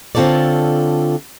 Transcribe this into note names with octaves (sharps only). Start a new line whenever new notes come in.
D3 C4 F4 A4 C#5 D5